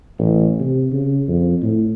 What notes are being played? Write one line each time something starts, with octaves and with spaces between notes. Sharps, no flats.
A1
C3
C#3
F2
A2